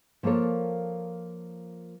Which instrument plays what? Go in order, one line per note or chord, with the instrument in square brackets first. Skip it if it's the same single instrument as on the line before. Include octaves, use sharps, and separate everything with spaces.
[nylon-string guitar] F3 A#3 A4 A#4 C#5